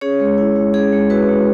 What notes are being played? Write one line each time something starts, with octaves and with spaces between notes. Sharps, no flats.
C#4 G#4 C#5
G#3
E4
G#3
C#4 G#4
G#3
E4 F#4 B4
G#3